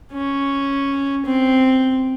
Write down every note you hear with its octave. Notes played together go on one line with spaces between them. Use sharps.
C#4
C4